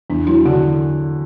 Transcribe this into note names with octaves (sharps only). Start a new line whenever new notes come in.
E2 D4
F#3 E4
D3 F#4